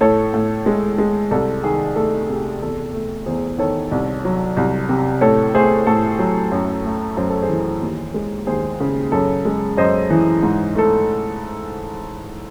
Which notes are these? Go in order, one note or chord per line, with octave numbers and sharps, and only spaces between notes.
A2 A4 C#5
A2
G#3
G#3
C2 A4
D#3 G#4
A3 A4
C3 G#4
E2 A4
A3
E2 G#4 C5
D#3 A4 C#5
C2
F#3
C2
C3
A2 A4 C#5
A3 G#4 C5
A2 A4
F#3
F#2
A3
F#2 C5
A4
G#4 C5
E3
D#2
G#3
D#2 G#4 C5
C#3
F#2 A4 C#5
G#3
F#2 C5 D#5
E3
G#2
A3 A4